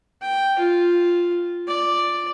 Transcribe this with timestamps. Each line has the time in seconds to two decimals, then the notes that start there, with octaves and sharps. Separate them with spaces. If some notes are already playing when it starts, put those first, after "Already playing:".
0.22 G5
0.59 F4
1.68 D5